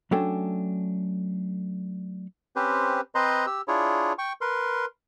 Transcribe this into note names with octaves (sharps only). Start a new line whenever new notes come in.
F#3 A3 C#4 D4 A4 G5
C4 C#4 G4 B4 C5
C4 B4 C5 D#5 A#5 C6
G4 E6
D4 E4 F4 G#4 C#5
G5 C#6
A#4 B4 C6